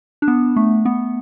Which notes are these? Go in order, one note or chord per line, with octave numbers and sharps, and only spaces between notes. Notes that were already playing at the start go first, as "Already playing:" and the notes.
D4
B3
A3
B3